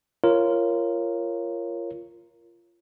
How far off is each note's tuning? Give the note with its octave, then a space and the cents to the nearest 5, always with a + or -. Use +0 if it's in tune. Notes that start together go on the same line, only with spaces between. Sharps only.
F4 -20 A#4 +0 C#5 -10